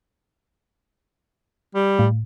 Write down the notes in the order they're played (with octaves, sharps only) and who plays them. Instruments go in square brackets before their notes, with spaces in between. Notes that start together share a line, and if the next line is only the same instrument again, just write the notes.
[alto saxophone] G3
[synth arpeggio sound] A2